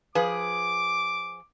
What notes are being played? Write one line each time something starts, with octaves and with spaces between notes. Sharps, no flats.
F3 G#4 B4 D6